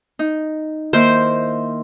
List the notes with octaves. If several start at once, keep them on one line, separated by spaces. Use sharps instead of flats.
D#4
D#3 A#3 E4 C5